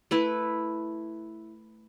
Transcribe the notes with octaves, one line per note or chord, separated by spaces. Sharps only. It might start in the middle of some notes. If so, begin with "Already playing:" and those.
A3 E4 B4